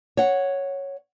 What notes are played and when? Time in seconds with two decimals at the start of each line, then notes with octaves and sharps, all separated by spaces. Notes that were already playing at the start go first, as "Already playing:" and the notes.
0.17 C#5 F#5